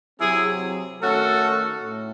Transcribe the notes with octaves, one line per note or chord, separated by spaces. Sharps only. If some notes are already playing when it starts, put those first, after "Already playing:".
C3 F#3 C4 E4 G#4
D#3 A3 C#4 F#4 A4
A2